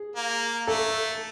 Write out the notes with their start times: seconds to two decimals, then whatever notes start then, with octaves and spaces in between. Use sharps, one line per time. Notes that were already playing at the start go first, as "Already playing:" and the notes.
Already playing: G#4
0.16 A#3
0.67 A3 A4